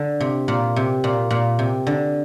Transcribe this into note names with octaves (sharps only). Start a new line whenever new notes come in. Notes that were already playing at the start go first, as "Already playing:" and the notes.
Already playing: D3
C3
A#2
C3
A#2
A#2
C3
D3